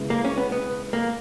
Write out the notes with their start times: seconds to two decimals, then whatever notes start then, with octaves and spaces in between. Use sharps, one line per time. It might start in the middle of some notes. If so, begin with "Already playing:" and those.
Already playing: C#3 G#3 B3 E4
0.10 A#3
0.25 C#4
0.38 B3
0.52 B3
0.93 A#3